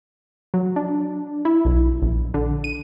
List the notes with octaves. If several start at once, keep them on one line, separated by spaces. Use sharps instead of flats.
F#3
D4
E4
B1
A#1
D3
D#7